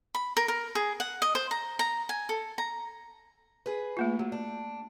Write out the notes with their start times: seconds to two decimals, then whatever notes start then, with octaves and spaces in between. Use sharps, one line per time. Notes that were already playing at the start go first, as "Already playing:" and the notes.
0.15 B5
0.37 A#4
0.48 A#4
0.75 G#4
1.00 F#5
1.22 D#5
1.35 C5
1.51 A#5
1.79 A#5
2.09 G#5
2.29 A4
2.58 A#5
3.66 G#4 B4
3.97 A3 A#3 F4
4.19 F#3
4.32 D4